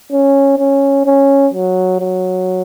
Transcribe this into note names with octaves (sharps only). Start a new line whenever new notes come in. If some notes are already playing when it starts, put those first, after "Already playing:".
C#4
C#4
C#4
F#3
F#3